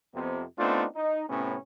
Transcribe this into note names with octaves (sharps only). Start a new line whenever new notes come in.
F2 C3 B3
A3 B3 C4 D4 D#4 F4
D#4
A2 C3 B3 C#4